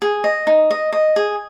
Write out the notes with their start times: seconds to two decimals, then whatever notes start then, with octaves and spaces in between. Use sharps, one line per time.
0.02 G#4
0.24 D#5
0.47 D#4
0.71 D#5
0.93 D#5
1.16 G#4